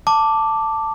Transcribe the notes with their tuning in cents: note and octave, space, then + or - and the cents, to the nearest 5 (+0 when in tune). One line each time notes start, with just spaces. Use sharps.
A5 +10 D6 +0